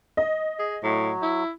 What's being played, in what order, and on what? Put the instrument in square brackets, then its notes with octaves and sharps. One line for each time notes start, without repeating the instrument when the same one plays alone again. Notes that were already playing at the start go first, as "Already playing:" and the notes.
[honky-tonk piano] D#5
[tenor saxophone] G#4
[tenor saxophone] A2 [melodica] F#3
[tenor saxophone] E4